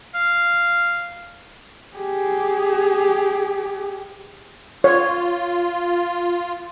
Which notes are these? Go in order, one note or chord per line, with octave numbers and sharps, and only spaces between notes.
F5
G4 G#4
F4 C#5